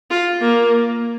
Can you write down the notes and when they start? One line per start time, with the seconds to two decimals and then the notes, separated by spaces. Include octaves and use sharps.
0.11 F4
0.41 A#3